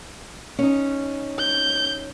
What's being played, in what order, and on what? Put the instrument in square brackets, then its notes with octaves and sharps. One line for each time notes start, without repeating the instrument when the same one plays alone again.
[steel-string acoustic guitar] C#4 D#4
[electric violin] G6